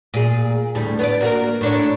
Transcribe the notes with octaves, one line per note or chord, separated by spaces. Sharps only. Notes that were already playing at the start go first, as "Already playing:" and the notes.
A#2 G#4
D2 A2 G3
B3 C4 D5
A#3 F#4 A#4
A2 D4 C#5